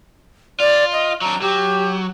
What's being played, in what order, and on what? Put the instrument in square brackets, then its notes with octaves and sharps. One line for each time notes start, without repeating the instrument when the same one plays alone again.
[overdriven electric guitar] F4 [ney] D5
[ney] D#5
[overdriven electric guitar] F#3 D4 [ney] A#5
[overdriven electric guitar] F#3 [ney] G4